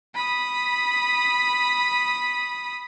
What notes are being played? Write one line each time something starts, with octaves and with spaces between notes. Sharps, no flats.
B5 D#6